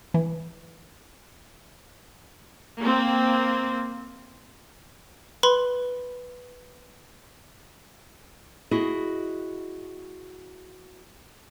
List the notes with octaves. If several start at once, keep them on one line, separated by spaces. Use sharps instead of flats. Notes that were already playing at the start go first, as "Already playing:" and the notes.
E3
A#3 C4
B4 B5 C6
E4 F#4 G#4 D#5